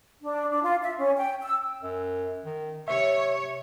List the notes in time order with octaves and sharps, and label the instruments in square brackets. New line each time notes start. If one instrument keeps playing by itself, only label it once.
[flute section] D4
D4
F4
E5
C#4
G5
E6
[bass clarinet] F#2
D#3
[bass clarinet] C3 [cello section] C#5 [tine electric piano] E5